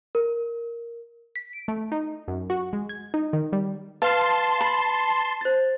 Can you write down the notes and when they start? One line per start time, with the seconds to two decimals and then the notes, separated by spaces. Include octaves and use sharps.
0.15 A#4
1.36 B6
1.53 D7
1.68 A3
1.92 D#4
2.28 F#2
2.50 F#4
2.73 G#3
2.89 G#6
3.14 D#4
3.33 D#3
3.53 G3
4.02 B4 F5 A5 C6 C7
4.61 B5
5.41 C5 A6